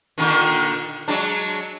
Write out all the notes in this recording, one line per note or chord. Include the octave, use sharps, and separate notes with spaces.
A#2 D3 D#3
F#3 G#3 D4